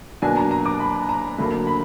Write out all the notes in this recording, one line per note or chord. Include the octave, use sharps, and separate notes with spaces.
B2 F#3 A#3 D4 G#5
A#5
A#5
D6
B5
A#5
D2 D3 F#3 A#3 B5
B5